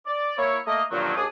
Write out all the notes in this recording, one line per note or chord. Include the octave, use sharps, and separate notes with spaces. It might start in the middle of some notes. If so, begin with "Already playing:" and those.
D5
A#3 E4 C#5
A3 A#3 D#5
G2 A#2 D3 D#3 F3 F#3
D#2 D4 G#4 D#6